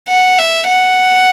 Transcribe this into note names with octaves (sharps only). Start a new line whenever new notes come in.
F#5
E5
F#5